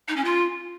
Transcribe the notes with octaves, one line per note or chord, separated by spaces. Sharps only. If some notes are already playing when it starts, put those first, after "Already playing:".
D#4
C#4
F4